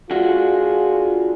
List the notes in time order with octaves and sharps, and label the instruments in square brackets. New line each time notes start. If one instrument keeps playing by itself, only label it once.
[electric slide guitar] D4 F#4 [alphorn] F4 [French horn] G#4